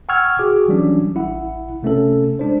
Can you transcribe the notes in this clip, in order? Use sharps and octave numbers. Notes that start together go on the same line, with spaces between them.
F#5 G5 C#6 E6 F6 G#6
F#4 G#4 D6
E3 F#3 G3 C#4 D4
A1 E4 F#5
C3 A3 C#4 A4
G#3 D4 C5